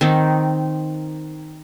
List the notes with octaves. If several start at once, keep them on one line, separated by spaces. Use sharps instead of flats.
D#3 C4 D#4